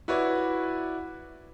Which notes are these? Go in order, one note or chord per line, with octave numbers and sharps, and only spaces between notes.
E4 F#4 B4 C#5 D5